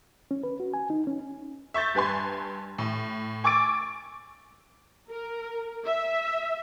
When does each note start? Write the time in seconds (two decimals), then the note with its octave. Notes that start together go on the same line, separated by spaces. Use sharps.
0.31 C#4
0.43 B4
0.60 F#4
0.74 G#5
0.90 D#4
1.07 C#4
1.74 E5 C#6 G6 A6
1.95 G2 B4 G#5 C6
2.78 A2
3.44 G#5 C#6 D6 E6 A6 D7
5.10 A#4
5.86 E5